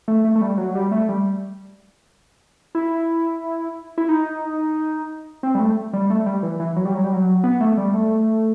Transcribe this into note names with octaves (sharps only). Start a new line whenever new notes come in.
A3
A3
A3
G3
F#3
G3
A3
G3
E4
E4
D#4
C4
G3
A3
G3
A3
G3
E3
E3
F#3
G3
F#3
G3
F#3
B3
A3
G3
A3